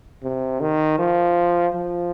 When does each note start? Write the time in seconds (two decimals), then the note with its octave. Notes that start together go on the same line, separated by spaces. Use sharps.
0.23 C3
0.60 D#3
0.99 F3
1.75 F3